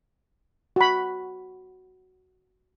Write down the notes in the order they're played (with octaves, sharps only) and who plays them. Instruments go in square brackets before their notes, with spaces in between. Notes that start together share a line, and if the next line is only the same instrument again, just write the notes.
[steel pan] F#4 B5